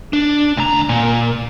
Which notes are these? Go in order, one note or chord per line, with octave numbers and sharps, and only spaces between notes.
D4
D2 A#5
A#2